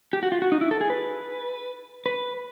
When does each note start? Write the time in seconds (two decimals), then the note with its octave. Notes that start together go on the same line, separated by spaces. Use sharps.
0.13 G4
0.23 F#4
0.32 F4
0.42 F#4
0.52 D#4
0.61 E4
0.71 A4
0.81 G#4
0.90 B4
2.06 B4